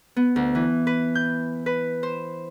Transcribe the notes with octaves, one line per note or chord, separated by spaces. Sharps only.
B3
D2
E3
B4
G6
B4
C5